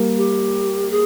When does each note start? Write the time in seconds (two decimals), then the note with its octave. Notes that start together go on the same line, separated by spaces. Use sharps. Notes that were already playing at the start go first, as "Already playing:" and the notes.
Already playing: G3 A#3
0.17 G4
0.90 G#4